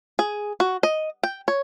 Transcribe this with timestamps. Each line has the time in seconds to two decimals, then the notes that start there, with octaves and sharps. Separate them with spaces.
0.19 G#4
0.60 F#4
0.83 D#5
1.23 G5
1.48 C#5